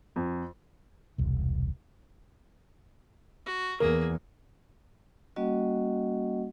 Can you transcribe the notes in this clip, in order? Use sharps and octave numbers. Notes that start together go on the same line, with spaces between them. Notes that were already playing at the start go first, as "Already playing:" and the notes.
F2
E1 C2
F#4
E2 A#3 G#4 A#4
G3 A#3 C#4 F#4 D#5 F#5